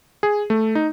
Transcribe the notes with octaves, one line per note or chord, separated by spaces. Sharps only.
G#4
A3
D#4